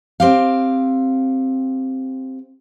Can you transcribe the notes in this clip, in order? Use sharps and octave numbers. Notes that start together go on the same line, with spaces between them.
C4 G4 F5